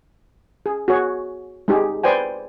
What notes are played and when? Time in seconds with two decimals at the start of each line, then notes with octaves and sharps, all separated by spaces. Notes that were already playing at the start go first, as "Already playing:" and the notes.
0.66 G#4
0.88 F#4 G#4 C#5
1.68 G#3 D#4 G4 G#4
2.03 B4 C5 D5 G5 G#5